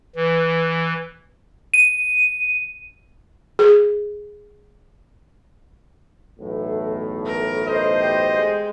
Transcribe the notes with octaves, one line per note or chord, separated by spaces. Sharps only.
E3
D#7
G#4
B1 E2 A2
A#4
C5 D#5
G4
G#3